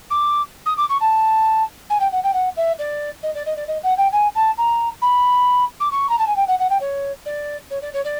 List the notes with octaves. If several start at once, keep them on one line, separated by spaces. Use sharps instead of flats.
D6
D#6
D6
C#6
A5
G#5
G5
F#5
G5
F#5
E5
D5
D#5
D5
D#5
D5
D#5
F#5
G5
G#5
A5
A#5
B5
D6
C#6
A#5
A5
G#5
G5
F#5
F#5
G5
C#5
D5
C#5
D5
C#5
D5